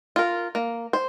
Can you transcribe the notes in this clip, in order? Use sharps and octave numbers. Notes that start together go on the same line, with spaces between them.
F4 A#4
A#3
C5